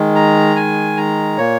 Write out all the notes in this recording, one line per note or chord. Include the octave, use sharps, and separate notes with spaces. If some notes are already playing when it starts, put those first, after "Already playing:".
Already playing: D#3 G#3
A#5
G#5
A#5
A#2 A#3 C#5